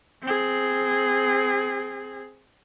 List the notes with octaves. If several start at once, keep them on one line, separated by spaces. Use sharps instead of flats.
C4 G#4